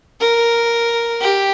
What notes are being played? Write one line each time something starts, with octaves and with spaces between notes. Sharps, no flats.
A#4
G4